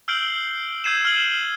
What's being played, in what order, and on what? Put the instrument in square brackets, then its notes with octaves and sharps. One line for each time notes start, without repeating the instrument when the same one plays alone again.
[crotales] E6 F6 G6 C7 D7 F#7
E6 G6 G#6 C7 D#7 E7
F6 F#7